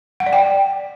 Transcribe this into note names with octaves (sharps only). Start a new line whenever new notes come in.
F#5
D5
G5